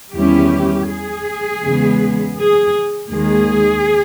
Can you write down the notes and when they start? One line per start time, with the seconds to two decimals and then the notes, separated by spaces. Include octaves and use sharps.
0.15 E2 D#3 G3 C#4 E4 G4
0.88 G#4
1.62 E2 C#3 G#3 B3
2.37 G#4
3.10 D#2 D#3 G#3 G#4